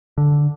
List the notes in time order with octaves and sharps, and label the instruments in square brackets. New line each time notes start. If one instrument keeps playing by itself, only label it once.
[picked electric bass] D3